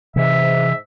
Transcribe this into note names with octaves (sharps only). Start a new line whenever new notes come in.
G#2 C3 E3 E5